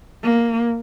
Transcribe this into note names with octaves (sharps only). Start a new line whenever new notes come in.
A#3